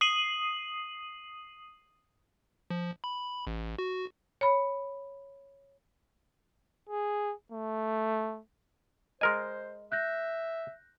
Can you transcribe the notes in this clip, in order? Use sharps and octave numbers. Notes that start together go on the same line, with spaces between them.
D#6 C7 D#7 F#7
F3
B5
A1
F#4
C#5 B5
G#4
A3
G#3 A#4 C5 D#5 G#5
E5 F#6 G6 A#6